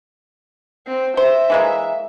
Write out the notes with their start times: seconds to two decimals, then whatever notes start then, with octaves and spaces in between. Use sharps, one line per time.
0.87 C4
1.17 C5 E5
1.50 E3 G#3 A#3